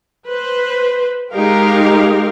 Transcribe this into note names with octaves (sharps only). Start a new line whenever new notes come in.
B4 C5
G#3 D#4 G4 A#4 F5